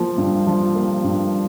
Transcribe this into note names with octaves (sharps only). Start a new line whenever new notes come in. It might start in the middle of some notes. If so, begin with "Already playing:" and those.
Already playing: F3 A#3
G2
F3
A#3
G2